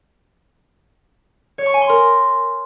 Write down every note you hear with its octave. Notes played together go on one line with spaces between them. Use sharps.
C#5
C#6
G#5
C6
A#4